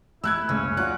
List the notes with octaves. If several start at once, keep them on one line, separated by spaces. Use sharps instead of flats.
A3 E4 E6 F#6 G#6
F#1 C#2 C#3 C#4
F#3 F4 F#4 D5 F#6